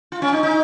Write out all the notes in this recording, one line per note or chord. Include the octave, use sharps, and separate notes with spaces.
F4
C#4
D#4
D#4